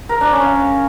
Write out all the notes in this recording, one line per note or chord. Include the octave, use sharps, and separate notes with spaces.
A#4
D4
C#4
F5